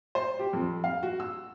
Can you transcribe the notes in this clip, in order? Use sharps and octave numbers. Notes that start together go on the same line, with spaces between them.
C5
G4
F2
F5
F#4
E6